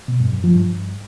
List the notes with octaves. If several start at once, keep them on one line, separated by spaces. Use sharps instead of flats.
B2
G2
F#2
F3
G2